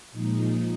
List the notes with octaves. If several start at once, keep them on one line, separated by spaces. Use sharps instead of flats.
A#2 F3 G#3 D#4